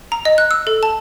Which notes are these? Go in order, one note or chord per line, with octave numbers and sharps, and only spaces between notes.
A#5
D#5
F#6
E6
A4
A5